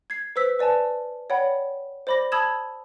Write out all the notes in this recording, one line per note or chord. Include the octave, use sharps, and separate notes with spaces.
G#6 C7
B4 C5 E6 B6
B4 D5 G#5 A5
C#5 D5 F#5 G5 B5
C5 D5 B5 D6 A#6
A5 B5 D#6 E6 G#6 E7